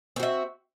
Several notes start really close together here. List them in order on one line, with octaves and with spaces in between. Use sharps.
C4 F#4 E5